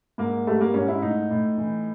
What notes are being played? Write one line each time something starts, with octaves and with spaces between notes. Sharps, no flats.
G#2 A#3
G3 A3
A#3
G#2 C#4
E4
A2 D#4
A2
E3